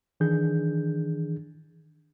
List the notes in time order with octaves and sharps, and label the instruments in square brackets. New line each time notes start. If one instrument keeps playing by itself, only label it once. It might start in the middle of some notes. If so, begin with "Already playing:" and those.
[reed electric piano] D#3 E3 D4 G#4 G6